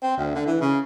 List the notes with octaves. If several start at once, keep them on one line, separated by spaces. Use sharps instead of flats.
C4
D2
D3
E3
C#3